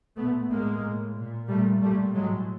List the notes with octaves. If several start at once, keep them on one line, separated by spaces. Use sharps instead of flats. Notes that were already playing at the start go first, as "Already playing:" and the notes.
A#2 A3 B3
A2 G#3 A#3
A2
A#2
A#2 G3 A3
A#2 G3 A3
A2 F#3 G#3